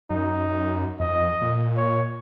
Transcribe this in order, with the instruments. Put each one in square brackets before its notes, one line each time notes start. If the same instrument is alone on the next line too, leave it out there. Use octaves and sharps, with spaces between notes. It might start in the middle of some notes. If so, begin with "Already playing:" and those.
[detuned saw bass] F#2 [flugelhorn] D#4
[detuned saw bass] F#2
[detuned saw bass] F2 [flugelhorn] D#5
[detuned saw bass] A#2
[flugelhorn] C#5